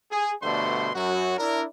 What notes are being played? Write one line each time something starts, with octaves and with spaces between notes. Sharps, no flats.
G#4
G2 B2 D3 A3 C5 C6
F#2 F#3 F#4
D4 E4 A#4